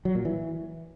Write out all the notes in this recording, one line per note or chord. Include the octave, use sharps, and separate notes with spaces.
F#3
A#2
E3